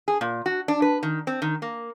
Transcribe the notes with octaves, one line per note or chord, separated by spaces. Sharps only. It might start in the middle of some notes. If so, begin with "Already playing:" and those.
G#4
A#2
F#4
D4
B4
D#3
C4
D#3
A#3